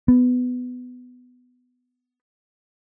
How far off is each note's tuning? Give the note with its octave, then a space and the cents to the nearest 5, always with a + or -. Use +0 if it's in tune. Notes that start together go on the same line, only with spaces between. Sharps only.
B3 +15